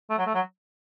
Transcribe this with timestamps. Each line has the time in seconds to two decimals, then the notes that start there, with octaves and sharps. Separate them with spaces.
0.10 A3
0.18 F#3
0.26 A3
0.35 F#3